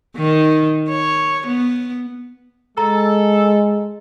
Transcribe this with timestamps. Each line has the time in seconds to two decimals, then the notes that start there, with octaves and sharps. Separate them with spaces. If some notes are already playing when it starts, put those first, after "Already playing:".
0.16 D#3
0.89 C#5
1.47 B3
2.78 G#3 A4 A#5